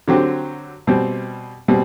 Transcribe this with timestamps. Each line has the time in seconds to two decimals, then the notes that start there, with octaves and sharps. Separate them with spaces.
0.08 D3 F#3 C4 G4
0.87 B2 G3 C4
1.68 B2 G3 C4